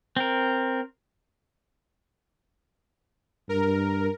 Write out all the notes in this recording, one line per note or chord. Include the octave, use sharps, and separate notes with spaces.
C4 A#4
G2 A#4